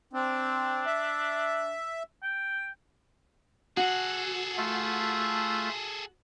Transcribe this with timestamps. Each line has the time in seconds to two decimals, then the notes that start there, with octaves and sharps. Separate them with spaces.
0.13 C4 D4
0.86 E5
2.23 G5
3.77 F#4 G#4 A4
4.58 A3 F4 E5